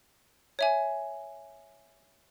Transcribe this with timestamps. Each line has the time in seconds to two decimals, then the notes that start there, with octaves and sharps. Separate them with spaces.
0.59 C#5 E5 G#5